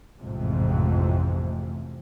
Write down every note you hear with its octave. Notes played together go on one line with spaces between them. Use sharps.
A1 F2 G#2 C3